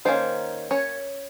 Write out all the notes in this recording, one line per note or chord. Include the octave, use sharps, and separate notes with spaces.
D#3 A#3 C#4 C5
C#4 C#5